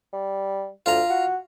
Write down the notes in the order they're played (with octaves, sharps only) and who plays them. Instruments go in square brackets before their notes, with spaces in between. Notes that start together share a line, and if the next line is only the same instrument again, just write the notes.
[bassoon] G3
[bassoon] D2 [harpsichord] F4 A#5
[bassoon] F#4